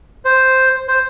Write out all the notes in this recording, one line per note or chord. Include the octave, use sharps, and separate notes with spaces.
C5
C5